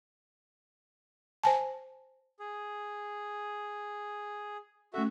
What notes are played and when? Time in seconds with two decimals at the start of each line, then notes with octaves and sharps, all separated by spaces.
1.43 C5 G#5 A5
2.40 G#4
4.94 A3 C#4 F#4 A4 E5